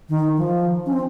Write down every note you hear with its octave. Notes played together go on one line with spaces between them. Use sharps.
D#3
F3
C#4
C4